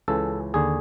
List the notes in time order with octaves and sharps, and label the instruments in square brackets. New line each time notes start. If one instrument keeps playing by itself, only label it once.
[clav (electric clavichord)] C#2 C#3 E3 A4
D#2 D3 G#4